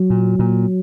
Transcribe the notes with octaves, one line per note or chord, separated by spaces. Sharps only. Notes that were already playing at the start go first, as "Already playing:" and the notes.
Already playing: F#3
A#2
A#2